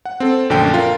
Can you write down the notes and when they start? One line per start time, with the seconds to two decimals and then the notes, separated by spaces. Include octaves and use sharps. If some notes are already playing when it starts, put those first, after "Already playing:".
0.05 F#5
0.20 C4 A4
0.50 A#1 F#2 D3 A3 G5
0.74 F4 A#4